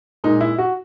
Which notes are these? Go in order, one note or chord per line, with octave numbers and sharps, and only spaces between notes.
A#2 G#3 D#4
E4
F#4